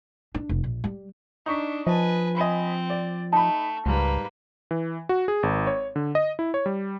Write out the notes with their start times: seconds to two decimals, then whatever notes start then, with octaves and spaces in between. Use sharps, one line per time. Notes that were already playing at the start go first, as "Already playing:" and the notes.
0.35 D4
0.49 F1
0.64 A#1
0.84 G3
1.46 D4 D#4 C#6 B6
1.87 F3 B4 D#5 G#5 A5
2.37 C4 D#5 G#5 B5
2.90 D5
3.33 A3 D#4 A5 B5
3.86 C#2 G#2 G3 A#3 B4
4.71 E3
5.09 F#4
5.28 G#4
5.43 G#1
5.67 C#5
5.96 D3
6.15 D#5
6.39 E4
6.54 C#5
6.66 G3